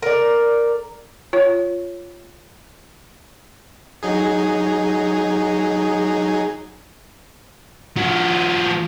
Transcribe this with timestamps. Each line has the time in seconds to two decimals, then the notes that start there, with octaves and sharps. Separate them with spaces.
0.02 A#4 D5
1.33 F4 C#5
4.03 F#3 D#4 G#4
7.97 F3 F#4